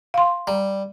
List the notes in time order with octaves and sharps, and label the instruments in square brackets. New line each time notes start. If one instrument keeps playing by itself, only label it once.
[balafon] F5 C6
[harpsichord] G3 [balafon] A#5